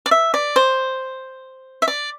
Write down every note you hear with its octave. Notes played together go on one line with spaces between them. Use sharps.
D5
E5
D5
C5
E5
D5